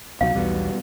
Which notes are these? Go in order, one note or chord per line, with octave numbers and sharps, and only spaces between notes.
C2 B2 F#3 F5
B1 E2 B2 G3 B3 F#4